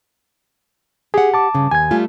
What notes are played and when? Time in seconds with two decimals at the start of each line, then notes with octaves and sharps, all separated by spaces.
1.14 G4 G#4 F#5
1.34 A5 D6
1.55 G2 C#3
1.71 D#2 G#5 G#6
1.91 G3 A3 F4